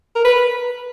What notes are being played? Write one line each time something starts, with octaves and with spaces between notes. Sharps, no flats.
A#4
B4